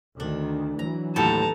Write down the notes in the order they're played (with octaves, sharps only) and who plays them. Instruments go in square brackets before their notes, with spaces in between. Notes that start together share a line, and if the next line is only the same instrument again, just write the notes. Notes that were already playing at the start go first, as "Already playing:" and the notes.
[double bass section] D2 D#3 [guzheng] D4
[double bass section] E3 F#3 [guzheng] A#5
[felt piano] D#2 A2 [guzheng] B3 A4 G5 [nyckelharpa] A5 A#5